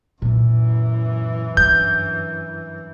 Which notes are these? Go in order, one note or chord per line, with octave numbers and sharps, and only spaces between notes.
F#2 A#2 E3 B3
G2 G6